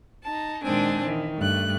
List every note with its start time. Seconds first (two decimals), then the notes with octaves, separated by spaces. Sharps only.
0.23 D#4 A5
0.63 A#2 D#3 G#3 C4 D4 G#5
1.04 D#3 E3
1.37 G2 A3 F#6